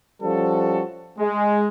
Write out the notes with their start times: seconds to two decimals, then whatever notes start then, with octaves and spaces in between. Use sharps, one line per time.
0.22 F3 G3 C#4 F#4 A4
1.18 G#3